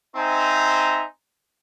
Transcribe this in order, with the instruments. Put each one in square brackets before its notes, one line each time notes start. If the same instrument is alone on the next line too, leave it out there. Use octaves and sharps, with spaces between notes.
[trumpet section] C4 D#4 C5 E5 G#5 A#5